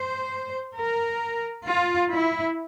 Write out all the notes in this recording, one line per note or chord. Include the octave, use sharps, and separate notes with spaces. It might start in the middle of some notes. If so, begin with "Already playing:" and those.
Already playing: C5
A#4
F4
E4